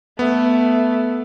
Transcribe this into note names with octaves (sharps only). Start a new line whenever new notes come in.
A3 B3